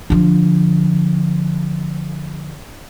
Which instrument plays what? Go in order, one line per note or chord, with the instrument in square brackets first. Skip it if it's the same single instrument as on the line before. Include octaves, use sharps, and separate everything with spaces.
[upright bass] D3 F3